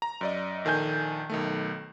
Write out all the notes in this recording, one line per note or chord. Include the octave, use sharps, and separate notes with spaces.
A#5
F#2 D5 D#5
A#1 D#3 A4 G#5 G6
B1 D#3 A3